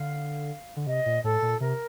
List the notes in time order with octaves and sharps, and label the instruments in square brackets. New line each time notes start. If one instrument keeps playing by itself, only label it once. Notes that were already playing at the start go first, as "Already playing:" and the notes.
Already playing: [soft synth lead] D3 [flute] F5
[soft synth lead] D3
[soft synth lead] C3 [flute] D#5
[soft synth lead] A#2
[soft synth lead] A2 [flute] A4
[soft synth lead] A#2
[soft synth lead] C3 [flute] A#4